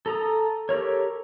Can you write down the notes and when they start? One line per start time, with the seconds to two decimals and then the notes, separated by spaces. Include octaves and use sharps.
0.06 A4 A#5 D#6
0.69 G4 A4 A#4 C#5